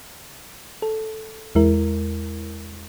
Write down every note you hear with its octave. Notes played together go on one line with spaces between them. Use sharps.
A4
E2 G#3 E4 A#4